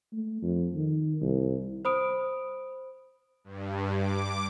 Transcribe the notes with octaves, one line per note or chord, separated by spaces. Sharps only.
A3
F2
D#3
C2
C5 B5 D#6 D7
G2
D6